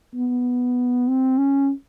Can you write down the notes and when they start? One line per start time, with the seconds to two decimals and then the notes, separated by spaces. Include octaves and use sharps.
0.15 B3
1.08 C4
1.38 C#4